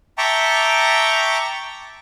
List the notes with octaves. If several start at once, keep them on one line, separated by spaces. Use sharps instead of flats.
E5 G5 A5 A#5 C#6 D6